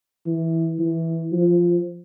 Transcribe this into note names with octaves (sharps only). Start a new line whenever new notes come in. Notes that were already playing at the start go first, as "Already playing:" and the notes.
E3
E3
F3